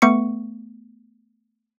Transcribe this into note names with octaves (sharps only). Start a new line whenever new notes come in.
A3 B3 C#6 C#7